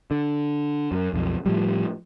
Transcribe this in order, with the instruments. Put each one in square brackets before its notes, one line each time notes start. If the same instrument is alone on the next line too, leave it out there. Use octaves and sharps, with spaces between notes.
[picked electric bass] D3
F#2
B1 F2
A2 F3 G3